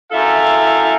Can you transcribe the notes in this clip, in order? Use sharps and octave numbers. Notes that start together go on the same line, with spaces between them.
F#2 E4 A4 E5 F5